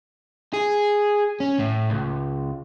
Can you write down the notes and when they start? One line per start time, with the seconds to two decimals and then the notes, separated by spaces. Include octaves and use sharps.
0.53 G#4
1.40 C#4
1.59 A2
1.90 C#2